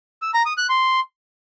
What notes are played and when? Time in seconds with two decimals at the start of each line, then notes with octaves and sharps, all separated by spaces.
0.22 E6
0.34 A#5
0.46 D#6
0.57 F#6
0.69 C6